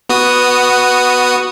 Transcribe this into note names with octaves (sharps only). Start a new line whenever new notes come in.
B3 F#4 D#6